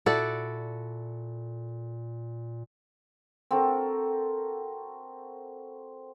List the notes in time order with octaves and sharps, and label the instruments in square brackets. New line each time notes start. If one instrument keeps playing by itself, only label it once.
[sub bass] A#2 [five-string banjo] E4 F#4 D5 [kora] A4
[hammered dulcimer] C4 F#4 A4 A#4